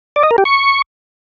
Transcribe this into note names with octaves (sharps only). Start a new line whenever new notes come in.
D5
D#5
A#4
G4
C#6